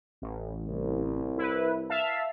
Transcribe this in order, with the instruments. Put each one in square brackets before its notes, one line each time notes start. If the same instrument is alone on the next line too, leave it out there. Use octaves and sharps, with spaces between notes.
[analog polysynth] A1
[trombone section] C2
[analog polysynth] E4 B4
E5 F5 A5